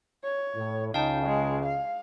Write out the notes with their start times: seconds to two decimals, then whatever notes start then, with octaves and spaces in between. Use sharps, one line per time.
0.24 C#5
0.56 A2
0.94 C#2 C#3 D#4 F5 G5 A5
1.26 G#3
1.65 F5